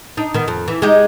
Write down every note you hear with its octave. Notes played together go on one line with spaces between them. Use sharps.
D4 D#4
D#3 B3
F2
E3
G#3 D#4 G4